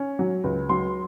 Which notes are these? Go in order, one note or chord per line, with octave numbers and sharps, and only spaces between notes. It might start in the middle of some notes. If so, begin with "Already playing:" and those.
Already playing: C#4
F#3
C#2
F#3 C6